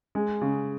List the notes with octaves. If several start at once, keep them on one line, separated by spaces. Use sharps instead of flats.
G#3
C#3